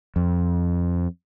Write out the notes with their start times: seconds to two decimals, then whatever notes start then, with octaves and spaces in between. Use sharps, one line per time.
0.16 F2